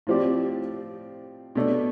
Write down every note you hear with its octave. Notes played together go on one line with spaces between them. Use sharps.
A2 F3 C4 G4 D5
B2 A3 D4